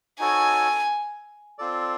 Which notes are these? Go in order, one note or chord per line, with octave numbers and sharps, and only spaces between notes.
D#4 F#4 A4 C#5 G#5
C4 F4 A4 D5